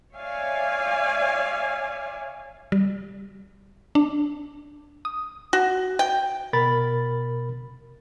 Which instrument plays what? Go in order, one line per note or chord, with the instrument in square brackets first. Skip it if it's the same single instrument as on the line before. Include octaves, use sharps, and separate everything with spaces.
[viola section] C#5 D5 E5 F5 G#5
[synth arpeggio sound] G3
D4
D#6
[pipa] F#4
G5
[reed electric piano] B2 A#4 B5 A6